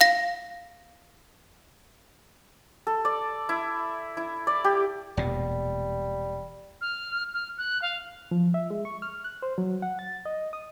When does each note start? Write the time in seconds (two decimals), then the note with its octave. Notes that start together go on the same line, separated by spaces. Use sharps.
0.01 F5 A#6
2.87 A4
3.05 D5
3.49 E4
4.17 E4
4.47 D5
4.64 G4
5.17 E1 A#2 G3
6.81 F6
7.33 F6
7.58 F#6
7.81 F5
8.31 F3
8.54 E5
8.71 G#3
8.85 C#6
9.02 F6
9.24 F#6
9.42 C5
9.58 F#3
9.82 F#5
9.99 A6
10.25 D#5
10.53 D#6